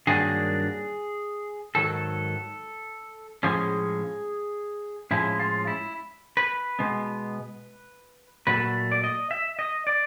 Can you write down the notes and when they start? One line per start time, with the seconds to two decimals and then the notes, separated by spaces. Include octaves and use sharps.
0.07 G2 D#3 F#3 A#3 D4 G#4
1.75 G#2 D#3 F#3 A4
3.43 A2 F3 G#3 C#4 G#4
5.11 A2 F3 G#3 C#4 E4
5.39 F4
5.67 E4
6.37 B4
6.79 B2 G#3 B3
8.47 A#2 F#3 A3 B4
8.92 D5
9.04 D#5
9.31 E5
9.59 D#5
9.87 D5